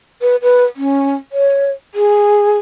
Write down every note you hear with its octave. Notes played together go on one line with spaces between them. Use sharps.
B4
B4
C#4
C#5
G#4